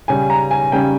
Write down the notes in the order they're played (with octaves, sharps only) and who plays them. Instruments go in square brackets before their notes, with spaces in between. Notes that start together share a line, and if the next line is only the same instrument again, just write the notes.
[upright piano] C#3 G3 C#4 G#5
A#5
G#5
C#3 G3 C#4 G5